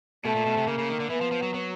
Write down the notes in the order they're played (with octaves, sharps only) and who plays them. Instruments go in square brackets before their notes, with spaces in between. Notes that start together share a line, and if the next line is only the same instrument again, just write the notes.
[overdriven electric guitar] B2 [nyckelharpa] A3
[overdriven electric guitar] A#2
B2
C3
[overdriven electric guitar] C#3 [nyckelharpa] A#3
[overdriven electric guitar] C#3
D#3
D3
[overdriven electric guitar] E3 [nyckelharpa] B3
[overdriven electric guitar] F3
F3
F#3
F#3